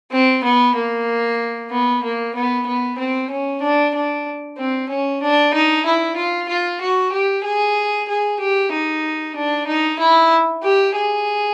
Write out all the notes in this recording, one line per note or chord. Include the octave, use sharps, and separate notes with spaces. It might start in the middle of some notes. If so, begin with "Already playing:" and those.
C4
B3
A#3
B3
A#3
B3
B3
C4
C#4
D4
D4
C4
C#4
D4
D#4
E4
F4
F4
F#4
G4
G#4
G#4
G4
D#4
D4
D#4
E4
G4
G#4